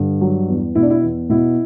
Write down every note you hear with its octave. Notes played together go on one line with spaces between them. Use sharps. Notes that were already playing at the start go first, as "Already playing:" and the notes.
Already playing: G2 D3
F#3
E2
B2 E4
D4
E4
E2
B2 E4